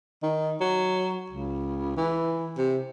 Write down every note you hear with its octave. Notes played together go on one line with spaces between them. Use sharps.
D#3
F#3
C#2
E3
C3